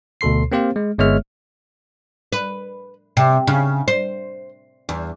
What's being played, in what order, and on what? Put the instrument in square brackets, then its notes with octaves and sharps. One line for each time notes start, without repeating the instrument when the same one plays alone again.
[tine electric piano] D2 B2 A4 C6 C7
A#3 C4 G4 C5 F5
G#3
G1 G#3 B3 C#5 E5 F6
[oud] B4
C3
C#3
C5
E2